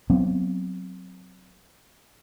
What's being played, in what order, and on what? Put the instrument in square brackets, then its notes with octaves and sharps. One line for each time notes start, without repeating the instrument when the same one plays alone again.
[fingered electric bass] F#3 B3 C4